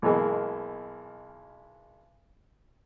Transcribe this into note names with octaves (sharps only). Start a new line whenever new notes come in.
B1 B2 E3 G#3 A#3